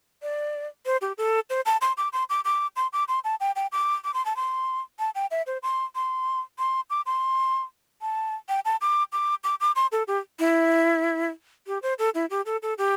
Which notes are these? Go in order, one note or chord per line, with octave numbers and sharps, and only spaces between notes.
D5
C5
G4
A4
C5
A5
C6
D6
C6
D6
D6
C6
D6
C6
A5
G5
G5
D6
D6
C6
A5
C6
A5
G5
E5
C5
C6
C6
C6
D6
C6
A5
G5
A5
D6
D6
D6
D6
C6
A4
G4
E4
G4
C5
A4
E4
G4
A4
A4
G4